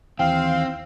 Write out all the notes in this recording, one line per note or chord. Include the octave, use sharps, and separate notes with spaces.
D#2 E3 C4 F5 G5